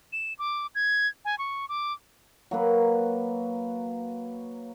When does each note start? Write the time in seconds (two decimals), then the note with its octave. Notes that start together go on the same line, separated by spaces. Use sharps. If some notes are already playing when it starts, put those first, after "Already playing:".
0.12 E7
0.39 D6
0.75 G#6
1.25 G#5
1.38 C#6
1.69 D6
2.51 F#3 A#3 B4